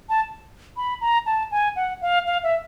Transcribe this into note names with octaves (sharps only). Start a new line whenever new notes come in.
A5
B5
A#5
A5
G#5
F#5
F5
F5
E5